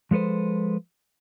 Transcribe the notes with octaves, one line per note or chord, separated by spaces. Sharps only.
F3 G#3 A4 B4 C5